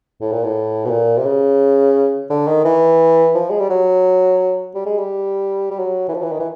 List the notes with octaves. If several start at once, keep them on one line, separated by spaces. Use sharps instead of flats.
A2
A#2
A2
B2
A#2
C3
C#3
D3
D#3
E3
F3
G#3
G3
F#3
G3
G#3
G3
G3
F#3
E3
F3
E3
D#3
E3